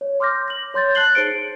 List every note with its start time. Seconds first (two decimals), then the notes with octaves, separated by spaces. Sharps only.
0.01 C#5
0.20 C6 D6 F6 G6 A#6
0.48 A#6 F#7
0.74 C#5 C6 G6 A6
0.95 A5 F#6 A6 C7 F#7 G7
1.15 D#4 G#4 C5 C#7 D7